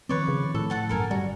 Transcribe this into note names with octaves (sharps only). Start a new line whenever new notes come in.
D#3 F3 C4 B4 C#5 D5
C#3
A2 A4
A4 F#5 A5
G1 F#2 A4 A#4 G#5
G3 F#4